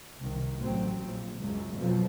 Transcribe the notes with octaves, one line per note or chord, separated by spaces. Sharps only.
C2 D#3
A1 F#3 C4
A#1
C#2 F#2
F2 B2 F3 F#3